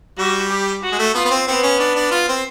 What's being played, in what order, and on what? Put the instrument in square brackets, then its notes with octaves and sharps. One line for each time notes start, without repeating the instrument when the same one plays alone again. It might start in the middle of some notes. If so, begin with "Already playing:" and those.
[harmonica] G3 [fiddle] F#4
[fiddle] G4
F#4
[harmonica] G#3
A3
[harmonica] B3 [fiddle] F4
[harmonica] B3
C4
[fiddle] B3 [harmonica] C4
[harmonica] C#4
D4
D4
F4
C4